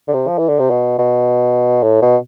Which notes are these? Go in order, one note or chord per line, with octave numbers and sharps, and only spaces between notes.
D3
C3
F3
E3
D3
C3
B2
B2
A2
B2